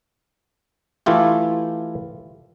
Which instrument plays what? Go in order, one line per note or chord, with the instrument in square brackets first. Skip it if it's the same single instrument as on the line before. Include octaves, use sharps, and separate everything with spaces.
[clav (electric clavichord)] E3 A3 E4 F4 G4